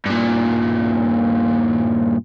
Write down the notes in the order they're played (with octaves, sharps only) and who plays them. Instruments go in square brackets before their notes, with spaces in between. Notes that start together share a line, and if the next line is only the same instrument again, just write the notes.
[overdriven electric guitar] G2 A#2